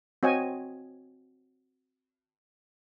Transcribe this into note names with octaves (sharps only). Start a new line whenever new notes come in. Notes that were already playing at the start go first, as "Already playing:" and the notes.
C4 F#4 C#5 D#5 G#5